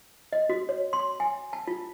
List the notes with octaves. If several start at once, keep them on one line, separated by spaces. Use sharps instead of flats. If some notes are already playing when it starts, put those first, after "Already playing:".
D#5
F#4
C#5
C6
G#5
A5
F4